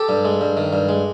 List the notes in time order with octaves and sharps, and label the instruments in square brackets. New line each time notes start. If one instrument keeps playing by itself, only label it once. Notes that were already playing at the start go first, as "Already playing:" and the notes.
Already playing: [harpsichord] G4 A4
G2
G#3
G2
D#3
G2
G#3